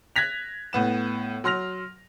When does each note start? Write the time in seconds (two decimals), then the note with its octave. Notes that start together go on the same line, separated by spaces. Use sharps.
0.16 F#6 G#6 A#6 B6 F7
0.73 A2 B3 E7
1.44 F#3 C6 F6 A#6 F7